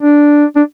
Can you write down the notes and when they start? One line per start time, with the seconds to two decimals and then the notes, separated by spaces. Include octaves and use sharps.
0.03 D4
0.56 D4